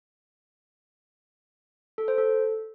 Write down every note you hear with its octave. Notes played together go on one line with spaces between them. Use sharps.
A4
C5
A4